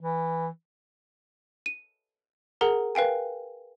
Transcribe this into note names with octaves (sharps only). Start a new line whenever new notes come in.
E3
D#7
G#4 A#4 F#5 A#5
A#4 B4 F5 G5 G#5